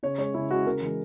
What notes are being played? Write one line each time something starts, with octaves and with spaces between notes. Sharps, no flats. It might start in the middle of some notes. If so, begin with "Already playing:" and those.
C#3 C#5
G#3 C#5
C#3 E4
G#3 F#4
C#3 A#4
E3 G#3